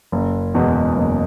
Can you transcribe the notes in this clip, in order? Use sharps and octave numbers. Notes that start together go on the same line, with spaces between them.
F#1
E2 B2 G#3
F#1